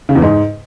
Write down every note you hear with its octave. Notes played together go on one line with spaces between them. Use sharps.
C#3
E2
G#2